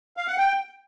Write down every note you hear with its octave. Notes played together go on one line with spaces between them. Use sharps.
F5
F#5
G5